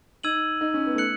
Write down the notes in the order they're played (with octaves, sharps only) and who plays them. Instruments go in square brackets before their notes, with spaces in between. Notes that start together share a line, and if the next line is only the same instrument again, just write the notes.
[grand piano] D#4 [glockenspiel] E6 G#6 D#7 F#7
[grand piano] D#4
C#4
B3
A3
[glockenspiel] F#6 C#7 F#7